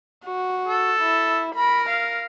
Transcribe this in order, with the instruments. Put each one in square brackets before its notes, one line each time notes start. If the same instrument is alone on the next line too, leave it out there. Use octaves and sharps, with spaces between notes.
[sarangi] F#4
[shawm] A4
[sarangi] E4
[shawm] A#4 [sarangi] B5
[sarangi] F5